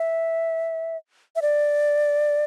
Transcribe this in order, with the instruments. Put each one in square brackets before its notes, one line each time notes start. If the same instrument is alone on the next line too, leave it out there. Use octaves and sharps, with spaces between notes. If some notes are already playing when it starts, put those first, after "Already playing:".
Already playing: [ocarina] E5
E5
D5